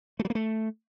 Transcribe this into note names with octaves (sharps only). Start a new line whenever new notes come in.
A3
F#3
A#3
A3